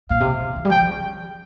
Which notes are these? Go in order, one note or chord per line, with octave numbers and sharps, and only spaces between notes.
A#2 F5
C3
C#3
E3
G3
F3 G5
F3
C#3